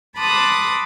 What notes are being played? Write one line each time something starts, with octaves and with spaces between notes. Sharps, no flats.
A5 B5 C6 D6 D#6 F#6